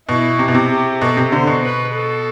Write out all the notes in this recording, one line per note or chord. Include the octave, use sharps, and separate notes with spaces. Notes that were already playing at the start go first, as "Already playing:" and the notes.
B2 E4
C3
B2
C3
G4
B2 A4
C3
D3 C5
B2
B4
A4